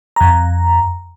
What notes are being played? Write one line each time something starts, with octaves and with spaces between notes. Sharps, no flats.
F2 A#5